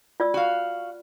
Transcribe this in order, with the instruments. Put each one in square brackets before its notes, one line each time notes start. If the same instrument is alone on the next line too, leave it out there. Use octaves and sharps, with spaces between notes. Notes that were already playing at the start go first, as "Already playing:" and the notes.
[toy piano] F4 D5 E6
[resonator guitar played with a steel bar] F#4 F5